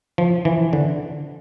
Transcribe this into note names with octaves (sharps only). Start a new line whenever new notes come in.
F3
E3
D3